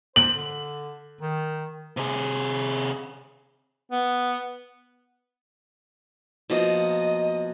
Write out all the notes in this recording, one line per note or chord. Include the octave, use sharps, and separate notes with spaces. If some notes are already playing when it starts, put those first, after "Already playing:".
C5 F#7
D3
D#3
C3 G#4
B3
B2 F3 A#3 D#5